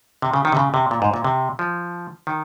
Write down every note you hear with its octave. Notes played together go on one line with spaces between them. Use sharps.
C3
C#3
D#3
C3
C#3
C3
A#2
G#2
A#2
C3
F3
D#3